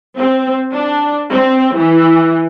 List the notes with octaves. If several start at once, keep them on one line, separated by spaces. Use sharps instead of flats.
C4
D4
C4
E3